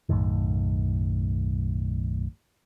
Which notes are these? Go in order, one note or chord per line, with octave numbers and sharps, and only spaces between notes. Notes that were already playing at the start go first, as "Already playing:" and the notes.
B1 F#2 A2 D#3